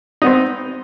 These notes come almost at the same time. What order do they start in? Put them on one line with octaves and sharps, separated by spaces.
D#4 B3 C4